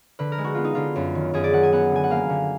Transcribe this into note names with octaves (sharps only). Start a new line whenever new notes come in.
D3 B4
A#4
G#3
F#4
B3 F4
D#4
D3 F4
F#2
D#3
F#2 G#4
D5
D#3 F#5
G#5
B3 F#5
D3 G#5
F#5
A#3 F5
D3